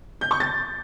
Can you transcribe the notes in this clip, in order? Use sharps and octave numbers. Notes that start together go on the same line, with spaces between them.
G6
C#6
A6